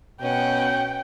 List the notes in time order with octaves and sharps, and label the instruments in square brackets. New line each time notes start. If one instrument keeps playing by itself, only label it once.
[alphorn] B2 [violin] C#4 F#5 [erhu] G5